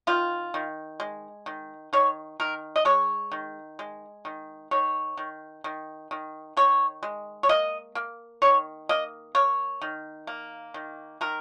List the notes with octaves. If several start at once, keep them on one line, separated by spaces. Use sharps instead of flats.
D#3 F4
D#3
G#3
D#3
D#3 C#5
D#3 A#4
D#5
G#3 C#5
D#3
G#3
D#3
D#3 C#5
D#3
D#3
D#3
D#3 C#5
G#3
C#5
A#3 D#5
A#3
D#3 C#5
A#3 D#5
A#3 C#5
D#3
A#3
D#3
D#3 A#4